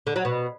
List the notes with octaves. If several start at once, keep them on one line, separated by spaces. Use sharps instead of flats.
D3
F#3
B2